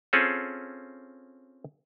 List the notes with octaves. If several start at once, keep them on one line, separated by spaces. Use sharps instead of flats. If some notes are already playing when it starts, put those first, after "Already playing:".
C4 C#4 F4 G#4 A4